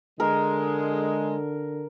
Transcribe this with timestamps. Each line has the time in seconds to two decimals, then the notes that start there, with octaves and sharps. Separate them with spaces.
0.20 D3 G#3 A#4